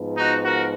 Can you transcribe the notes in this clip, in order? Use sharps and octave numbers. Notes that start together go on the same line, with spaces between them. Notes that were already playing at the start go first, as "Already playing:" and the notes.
Already playing: G#2 F3 B3
D#4 F#4
F#4 A#4